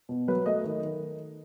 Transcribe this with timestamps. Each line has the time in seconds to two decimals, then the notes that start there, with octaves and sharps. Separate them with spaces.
0.09 B2
0.28 F#3 B4
0.46 A3 D#5
0.64 D#3
0.82 D#3